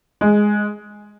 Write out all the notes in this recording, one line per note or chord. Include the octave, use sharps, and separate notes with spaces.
G#3